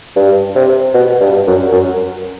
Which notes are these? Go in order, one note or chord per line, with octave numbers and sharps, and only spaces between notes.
G2
C3
B2
G2
F#2
F#2